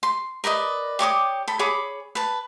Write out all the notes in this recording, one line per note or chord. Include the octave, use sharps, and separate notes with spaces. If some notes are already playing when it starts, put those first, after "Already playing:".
C6
A#4 B4 D5 D#5
G4 C#5 D6 D#6
A4 B5
G#4 C#5 B5 D6
B4 A5